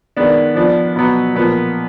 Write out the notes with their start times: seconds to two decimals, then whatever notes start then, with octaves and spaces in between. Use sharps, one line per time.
0.17 D#3 G#3 B3 D4
0.55 F3 B3 D4
0.96 B2 F#3 B3
1.35 A#2 F3 B3